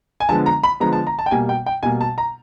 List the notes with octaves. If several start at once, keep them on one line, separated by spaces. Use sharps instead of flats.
G#5
D3 F3 G#3 B3 A5
A#5
B5
D3 F3 G#3 B3 A#5
A5
A#5
A5
G5
B2 G3 A#3 G#5
G5
G5
B2 G3 A#3 G#5
A5
A#5